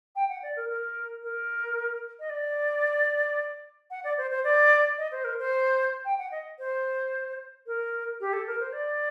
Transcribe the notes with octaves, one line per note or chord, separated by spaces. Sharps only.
G5
F#5
D5
A#4
A#4
A#4
D#5
D5
F#5
D5
C5
C5
D5
D#5
C5
A#4
C5
G5
F#5
D#5
C5
A#4
G4
A4
A#4
C5
D5